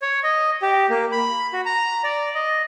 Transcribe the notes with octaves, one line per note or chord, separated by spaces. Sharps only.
C#5
D#5
G4
A#3
B5
F#4
A#5
D5
D#5